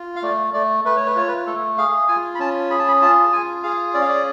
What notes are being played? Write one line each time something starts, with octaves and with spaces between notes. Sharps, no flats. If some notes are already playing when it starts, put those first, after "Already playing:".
Already playing: F4
F5
A3 D5
A3 D5
A3 B4
C#5
B4
F4 C#5
B4
A3 A4
G#4 F5
F4 G#5
B5
C#4 A5
G#4 B5
A5
B5
F4 A5
F4 G#5
G#4 F5
C#4 D5
F5
D5